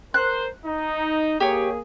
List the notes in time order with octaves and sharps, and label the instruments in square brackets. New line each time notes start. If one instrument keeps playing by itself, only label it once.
[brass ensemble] A#4 C5 [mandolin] F#6
[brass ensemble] D#4
[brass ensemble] A#3 G#4 [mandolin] G4 C#5